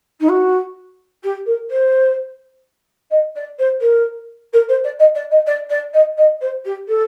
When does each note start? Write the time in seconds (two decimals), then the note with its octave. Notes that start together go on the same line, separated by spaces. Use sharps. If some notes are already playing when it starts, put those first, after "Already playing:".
0.20 D#4
0.28 F#4
1.23 G4
1.46 A#4
1.70 C5
3.11 D#5
3.35 D5
3.59 C5
3.81 A#4
4.53 A#4
4.68 C5
4.84 D5
4.99 D#5
5.15 D5
5.31 D#5
5.46 D5
5.70 D5
5.93 D#5
6.17 D#5
6.41 C5
6.65 G4
6.88 A4